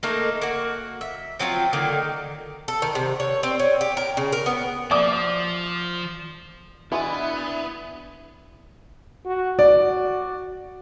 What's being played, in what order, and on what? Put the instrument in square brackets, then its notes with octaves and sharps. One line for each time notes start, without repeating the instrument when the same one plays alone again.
[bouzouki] A3 A#3 D#4
A#3 F#4
E5
F3 F#3 C4 F4
D3 D#3 F#3 A#3
A4
D#3
C3
C#5
C4
C#4
G4
A#4
C#3
A#4
B3
[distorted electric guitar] F3 [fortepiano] D5 D6 D#6
[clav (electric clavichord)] B2 E3 G#3 [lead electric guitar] B3 [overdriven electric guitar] D4 F5 [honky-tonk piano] E4
[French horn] F#4
[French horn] F#4 [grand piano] D5